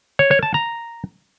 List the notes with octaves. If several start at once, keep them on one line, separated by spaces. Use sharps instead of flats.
C#5
C#5
A5
A#5